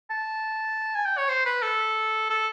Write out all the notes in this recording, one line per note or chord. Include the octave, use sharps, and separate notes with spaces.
A5
G#5
G5
C#5
C5
B4
A4
A4